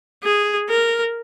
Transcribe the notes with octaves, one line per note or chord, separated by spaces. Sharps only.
G#4
A#4